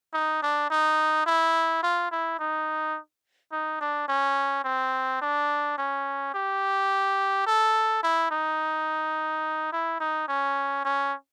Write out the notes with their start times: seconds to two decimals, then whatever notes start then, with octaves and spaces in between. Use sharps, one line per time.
0.13 D#4
0.42 D4
0.70 D#4
1.26 E4
1.83 F4
2.11 E4
2.39 D#4
3.52 D#4
3.81 D4
4.08 C#4
4.64 C4
5.21 D4
5.78 C#4
6.34 G4
7.46 A4
8.03 E4
8.31 D#4
9.72 E4
10.00 D#4
10.28 C#4
10.84 C#4